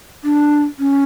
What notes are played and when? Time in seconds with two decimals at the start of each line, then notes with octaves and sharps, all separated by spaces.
0.24 D4
0.79 C#4